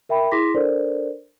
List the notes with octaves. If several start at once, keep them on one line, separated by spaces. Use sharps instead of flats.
A#4 E5 G5 B5
E4 G#4 C6 D6 A#6 B6
D4 A4 A#4 C5 D5